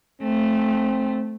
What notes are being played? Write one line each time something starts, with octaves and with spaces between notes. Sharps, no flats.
A3 C4